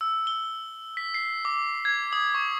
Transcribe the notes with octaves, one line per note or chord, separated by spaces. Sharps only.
E6
G7
B6
C7
D6
G#6
D#6
C#6